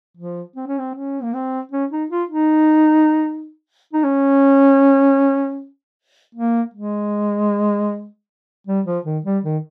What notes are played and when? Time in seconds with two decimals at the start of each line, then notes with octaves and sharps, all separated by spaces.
0.17 F3
0.56 C4
0.67 C#4
0.79 C4
0.95 C#4
1.23 A#3
1.34 C4
1.72 C#4
1.91 D#4
2.10 F4
2.30 D#4
3.93 D#4
4.04 C#4
6.35 A#3
6.74 G#3
8.67 G3
8.86 F3
9.05 D#3
9.25 G3
9.44 D#3